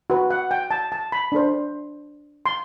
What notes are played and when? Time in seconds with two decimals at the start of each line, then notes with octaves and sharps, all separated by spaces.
0.10 F#4 B4
0.31 F#5
0.51 G5
0.71 A5
0.92 A5
1.12 B5
1.32 D4 A4 C5
2.46 C6